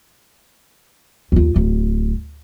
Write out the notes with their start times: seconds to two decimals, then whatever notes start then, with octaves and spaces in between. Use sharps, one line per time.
1.32 D#2 F4
1.56 D1